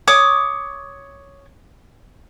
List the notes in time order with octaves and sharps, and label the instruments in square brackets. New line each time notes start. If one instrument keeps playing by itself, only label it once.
[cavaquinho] C#5 D6 D#6